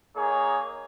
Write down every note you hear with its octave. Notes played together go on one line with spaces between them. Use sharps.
A#3 D#4 G#4 C#5